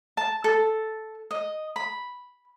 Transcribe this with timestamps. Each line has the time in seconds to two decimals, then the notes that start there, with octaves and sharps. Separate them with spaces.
0.17 A5
0.44 A4
1.31 D#5
1.76 B5